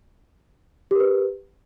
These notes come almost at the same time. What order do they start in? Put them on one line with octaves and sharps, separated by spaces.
G4 A#4 B4